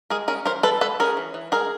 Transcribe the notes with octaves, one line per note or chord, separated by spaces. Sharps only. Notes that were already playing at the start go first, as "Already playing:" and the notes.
G#3 G#4 A#4
C#4 G#4 A#4
E3 A#4 C5
E3 A4 B4
G#3 A4 B4
C#4 G#4 A#4
E3
E3
G#3 G#4 A#4